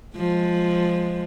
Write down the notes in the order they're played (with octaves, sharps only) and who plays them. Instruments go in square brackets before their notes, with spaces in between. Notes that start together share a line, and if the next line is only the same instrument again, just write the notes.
[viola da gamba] F3 G#3